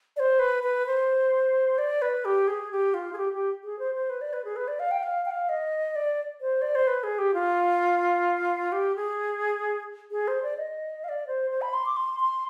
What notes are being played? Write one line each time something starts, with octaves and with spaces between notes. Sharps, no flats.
D5
C5
B4
B4
C5
D5
B4
G4
G#4
G4
F4
G#4
G4
G4
G#4
C5
C5
B4
D5
B4
G#4
B4
D5
F5
G5
F5
G5
F5
D#5
D5
C5
D5
C5
B4
G#4
G4
F4
G4
G#4
G#4
C5
D5
D#5
F5
D5
C5
C5
B5
C6
D6
C6
C6